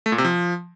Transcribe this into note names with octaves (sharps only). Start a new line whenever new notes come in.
A3
A#2
C3
F3